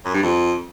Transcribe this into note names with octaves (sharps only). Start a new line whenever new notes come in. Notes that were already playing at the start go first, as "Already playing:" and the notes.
F#2
G2
F2